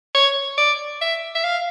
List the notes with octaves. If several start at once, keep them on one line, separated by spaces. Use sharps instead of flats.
C#5
D5
E5
E5
F5